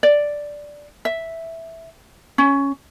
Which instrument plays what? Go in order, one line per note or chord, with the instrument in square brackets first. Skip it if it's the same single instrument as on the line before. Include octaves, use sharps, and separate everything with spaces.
[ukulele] D5
E5
C#4